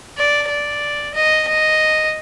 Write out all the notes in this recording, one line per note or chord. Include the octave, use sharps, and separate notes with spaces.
D5
D5
D#5
D#5